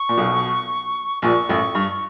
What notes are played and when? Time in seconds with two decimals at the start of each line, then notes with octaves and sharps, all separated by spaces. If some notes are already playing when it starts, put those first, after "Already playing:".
Already playing: C#6
0.09 A#2
0.17 B1 B2
1.22 A#1 A#2 C#6
1.49 A1 A2
1.75 G2